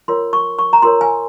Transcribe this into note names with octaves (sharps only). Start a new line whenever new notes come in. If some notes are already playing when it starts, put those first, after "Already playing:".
F4 A#4 C#5 C6
C#6
C#6
A#5
F4 A#4 C#5 C6
G#5